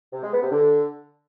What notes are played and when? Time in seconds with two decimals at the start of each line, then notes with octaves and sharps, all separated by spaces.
0.13 C3
0.23 G#3
0.32 B3
0.42 C3
0.52 D3